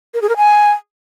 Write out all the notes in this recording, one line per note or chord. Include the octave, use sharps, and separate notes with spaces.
A#4
G#4
A#4
G#5